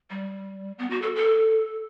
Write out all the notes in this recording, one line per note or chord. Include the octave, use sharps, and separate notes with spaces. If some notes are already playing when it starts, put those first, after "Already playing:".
G3
B3
F#4
A4
A4